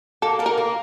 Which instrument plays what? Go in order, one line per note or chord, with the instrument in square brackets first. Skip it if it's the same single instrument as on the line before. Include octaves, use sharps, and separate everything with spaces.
[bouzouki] A#3 [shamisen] A4
[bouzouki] A#3 [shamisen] A4
[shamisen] A#4
[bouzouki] A#3